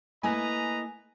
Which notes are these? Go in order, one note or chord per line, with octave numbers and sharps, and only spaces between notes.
A3 A#3 E4 B4 D#5 G#5 A#5